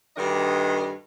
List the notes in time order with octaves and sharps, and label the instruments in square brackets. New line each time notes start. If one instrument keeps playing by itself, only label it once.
[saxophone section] D2 G2 D#3 D4 D#5